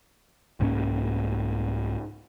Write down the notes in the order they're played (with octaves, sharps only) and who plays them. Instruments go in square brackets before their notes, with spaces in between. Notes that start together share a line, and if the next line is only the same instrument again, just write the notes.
[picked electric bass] C2 G#2 A#3 C#4